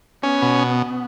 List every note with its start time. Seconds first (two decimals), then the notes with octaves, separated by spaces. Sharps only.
0.23 B3 C#4
0.42 B2